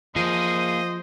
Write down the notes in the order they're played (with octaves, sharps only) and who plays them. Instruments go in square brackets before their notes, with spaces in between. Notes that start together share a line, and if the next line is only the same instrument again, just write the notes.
[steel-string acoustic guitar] F3 [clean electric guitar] A#3 G#4 [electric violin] C5 [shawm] D#5